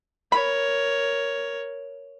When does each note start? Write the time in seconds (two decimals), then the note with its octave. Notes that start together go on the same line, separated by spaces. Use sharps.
0.32 A#4 C#5 B5